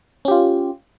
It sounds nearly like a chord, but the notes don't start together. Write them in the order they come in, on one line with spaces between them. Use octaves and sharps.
C#4 G4 F4